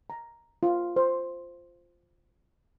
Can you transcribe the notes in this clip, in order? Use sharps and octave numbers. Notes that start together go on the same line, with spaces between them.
A#5
F4
C5